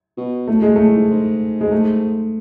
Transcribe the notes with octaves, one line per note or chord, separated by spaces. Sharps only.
B2
A2 A3
A2 G#3
A2 A3
G#2
G#2
G#3
A3